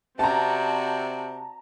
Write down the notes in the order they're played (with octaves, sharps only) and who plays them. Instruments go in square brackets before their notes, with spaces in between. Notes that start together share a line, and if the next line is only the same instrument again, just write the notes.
[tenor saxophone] C3 [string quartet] C4 F#4 D5 [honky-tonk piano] A5 A#5